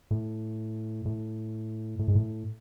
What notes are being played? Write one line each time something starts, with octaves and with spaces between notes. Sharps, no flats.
A2
A2
A2
G#2
A2